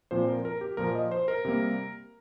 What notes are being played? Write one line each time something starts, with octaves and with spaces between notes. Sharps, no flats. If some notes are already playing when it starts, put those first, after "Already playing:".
A#2 F3 C4 C5
A#4
A#4
G4
A#2 F3 A#3 A#4
D#5
C5
A#4
C3 G3 A#3